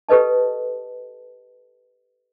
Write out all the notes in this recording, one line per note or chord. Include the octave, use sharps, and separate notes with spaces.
G4 A4 B4 D#5 A5